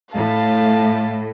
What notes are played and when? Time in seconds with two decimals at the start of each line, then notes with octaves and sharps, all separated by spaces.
0.15 A2 F5 A5